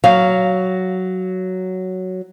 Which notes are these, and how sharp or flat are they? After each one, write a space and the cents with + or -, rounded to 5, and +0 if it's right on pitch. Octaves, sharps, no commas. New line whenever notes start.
F#3 +5 F5 +0